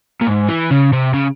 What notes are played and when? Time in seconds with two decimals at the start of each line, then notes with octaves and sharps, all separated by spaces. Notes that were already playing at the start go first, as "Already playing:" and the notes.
0.21 A#2
0.27 G#2
0.49 E3
0.71 C#3
0.93 C3
1.14 C#3